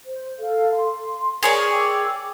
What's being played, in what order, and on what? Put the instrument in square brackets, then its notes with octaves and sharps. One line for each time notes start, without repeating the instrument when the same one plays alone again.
[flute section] C5
A4 F5
C6
[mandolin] G#4 C#5 D5 [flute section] A#4
[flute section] G5 D6 E6